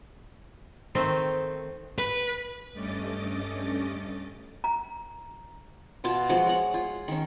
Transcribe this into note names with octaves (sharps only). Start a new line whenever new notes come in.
D#3 A3 C4 A4 D#5
B4
G2 A3 C#4 D#5 D6 A6
A#5
B2 F4 A5
F3 G#3 F#4
C#5 F#5
F4
D#3 C#4